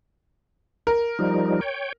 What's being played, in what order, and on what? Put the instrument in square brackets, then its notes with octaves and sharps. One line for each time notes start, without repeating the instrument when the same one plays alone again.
[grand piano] A#4
[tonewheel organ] F3 G3 D#4
C#5 G5